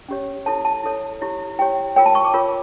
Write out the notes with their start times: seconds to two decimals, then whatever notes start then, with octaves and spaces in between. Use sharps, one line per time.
0.08 C#4 G4 C#5
0.46 E4 A4 C#5 A5
0.65 A5
0.84 E4 A4 C#5
1.21 E4 G4 C#5
1.59 E4 G4 C#5 G5
1.96 F4 A#4 C#5 G5
2.06 A5
2.15 C#6
2.25 D6
2.34 F4 A#4 C#5